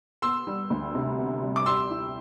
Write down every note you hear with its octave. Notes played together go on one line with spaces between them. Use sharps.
B3 C6 E6
G3
D2
C3
B3
G3
D6
G4 C6 E6
E4